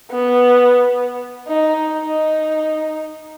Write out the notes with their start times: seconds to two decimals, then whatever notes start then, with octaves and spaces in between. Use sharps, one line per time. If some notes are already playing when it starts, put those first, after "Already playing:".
0.11 B3
1.48 D#4
1.93 D#4